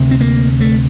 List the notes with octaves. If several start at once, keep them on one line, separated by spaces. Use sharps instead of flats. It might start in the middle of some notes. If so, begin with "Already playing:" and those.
Already playing: D2 C3
C4
A#3
A3